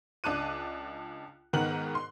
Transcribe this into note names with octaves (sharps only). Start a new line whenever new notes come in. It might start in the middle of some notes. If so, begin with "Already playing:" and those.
C#2 D4 A5 D6 F#6 D#7
G#2 D#3 B3 A#4 F#6 F#7
C6